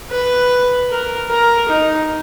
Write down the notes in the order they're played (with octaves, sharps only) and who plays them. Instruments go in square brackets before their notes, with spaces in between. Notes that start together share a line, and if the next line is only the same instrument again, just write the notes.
[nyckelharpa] B4
A#4
A#4
D#4